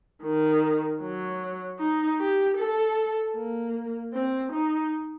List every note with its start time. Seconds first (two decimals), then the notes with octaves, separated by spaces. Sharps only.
0.23 D#3
1.02 F#3
1.79 D#4
2.19 G4
2.58 A4
3.36 A#3
4.14 C4
4.53 D#4